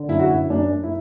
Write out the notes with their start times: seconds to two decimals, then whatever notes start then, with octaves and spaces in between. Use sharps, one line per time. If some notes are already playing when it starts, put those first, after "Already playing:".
Already playing: D3
0.09 F#2 E4
0.19 F#4
0.30 F#2 E4
0.50 F#2 D4
0.71 F#2
0.83 E4